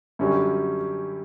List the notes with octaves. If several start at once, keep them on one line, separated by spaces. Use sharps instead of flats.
F#2 D3 G3 C#4 F#4